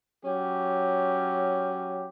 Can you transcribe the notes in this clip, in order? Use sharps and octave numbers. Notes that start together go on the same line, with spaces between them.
F#3 C#4 G4